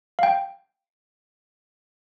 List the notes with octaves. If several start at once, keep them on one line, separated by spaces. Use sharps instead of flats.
F5 G5